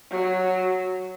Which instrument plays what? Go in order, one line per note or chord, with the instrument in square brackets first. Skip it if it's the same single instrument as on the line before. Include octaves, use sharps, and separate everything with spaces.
[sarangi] F#3